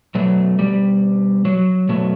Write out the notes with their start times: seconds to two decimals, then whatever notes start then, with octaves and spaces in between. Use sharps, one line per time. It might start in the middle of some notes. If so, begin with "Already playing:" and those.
0.15 B2 F#3 A3
0.59 G3
1.45 F#3
1.89 B2 F#3 A3